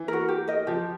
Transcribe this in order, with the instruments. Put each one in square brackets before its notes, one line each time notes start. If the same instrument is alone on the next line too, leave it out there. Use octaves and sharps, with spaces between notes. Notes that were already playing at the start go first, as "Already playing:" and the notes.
Already playing: [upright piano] E3
[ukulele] F#4 A#4
G4
A#4 D#5
[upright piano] F3 [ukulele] G4